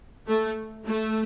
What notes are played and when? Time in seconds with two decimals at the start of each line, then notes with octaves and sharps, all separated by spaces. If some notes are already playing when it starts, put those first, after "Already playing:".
0.28 A3
0.86 A3